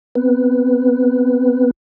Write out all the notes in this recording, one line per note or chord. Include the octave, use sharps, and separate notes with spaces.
B3 C4 B4